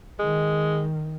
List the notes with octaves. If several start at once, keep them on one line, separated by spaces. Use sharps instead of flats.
D#3 G#3